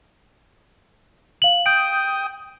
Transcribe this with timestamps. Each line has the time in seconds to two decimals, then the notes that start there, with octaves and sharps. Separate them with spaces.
1.42 F5 F#7
1.66 G5 D#6 G6 D7